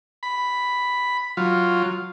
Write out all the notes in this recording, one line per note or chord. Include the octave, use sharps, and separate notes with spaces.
B5
F#3 F4